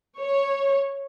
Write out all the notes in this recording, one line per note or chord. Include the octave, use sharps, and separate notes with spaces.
C#5